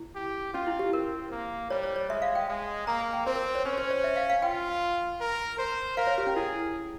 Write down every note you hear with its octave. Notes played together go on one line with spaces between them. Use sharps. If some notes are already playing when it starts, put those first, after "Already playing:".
Already playing: E4
G4
C#4 F4
E4
G4
C4 A#4
A#3
G3 C#5
C#5
C#5
G#3 E5
F5
G5
G#3
A#3 A#5
G#5
G5
C4 C5
A#4
C5
C#5
C#4 C5
C5
C#5
E5
F5
F5
F4 G5
A#4
C5
A#4 F5
C#5
G4
C#4
E4 G#4